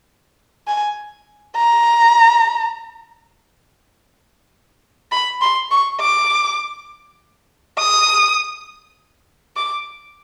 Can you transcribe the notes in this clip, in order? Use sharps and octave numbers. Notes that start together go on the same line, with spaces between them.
G#5
A#5
B5
C6
C#6
D6
D#6
D6